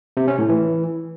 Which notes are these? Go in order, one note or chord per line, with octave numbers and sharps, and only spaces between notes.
C3
C#4
A2
E3